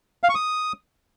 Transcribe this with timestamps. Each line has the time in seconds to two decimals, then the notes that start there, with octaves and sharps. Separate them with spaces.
0.24 F5
0.29 C#6
0.35 D#6